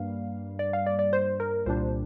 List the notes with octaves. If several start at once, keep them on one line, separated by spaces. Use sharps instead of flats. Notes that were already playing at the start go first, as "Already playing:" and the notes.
Already playing: G2 G3 A#3 F5
D5
F5
D5
D5
C5
A#4
C2 A#2 G3 D4 C5